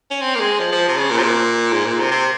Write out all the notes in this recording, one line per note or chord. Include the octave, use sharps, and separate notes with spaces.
C#4
C4
A#3
G#3
F3
F3
C3
C#3
A#2
C3
A#2
G#2
A#2
C3
C3